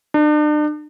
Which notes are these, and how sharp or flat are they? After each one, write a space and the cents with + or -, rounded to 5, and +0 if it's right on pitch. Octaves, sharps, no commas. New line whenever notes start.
D4 +40